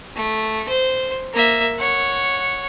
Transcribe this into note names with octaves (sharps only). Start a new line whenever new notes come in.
A3
C5
A#3 E5
C#5 F#5